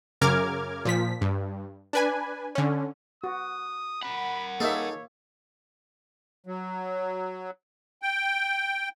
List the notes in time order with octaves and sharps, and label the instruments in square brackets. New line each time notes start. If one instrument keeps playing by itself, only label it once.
[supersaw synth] F#2 C#3 A#4 D6 F6 G#6
A#2 F3 B6
G2
D4 B4 G#5
D3 C#4
[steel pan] F#4 [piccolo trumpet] D#6
[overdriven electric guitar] A#4 F#5 [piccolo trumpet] B5
[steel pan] A#3 E5 [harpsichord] D#4 G#4 A4 [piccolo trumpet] C#5
[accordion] F#3
G5